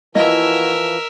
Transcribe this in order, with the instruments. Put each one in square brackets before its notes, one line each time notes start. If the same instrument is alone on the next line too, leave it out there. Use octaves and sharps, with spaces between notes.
[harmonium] E3 F3 [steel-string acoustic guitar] A#3 E4 F#4 [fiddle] A#4 E5 [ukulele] D#5